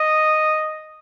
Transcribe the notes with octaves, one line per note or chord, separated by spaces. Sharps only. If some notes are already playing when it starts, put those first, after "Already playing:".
Already playing: D#5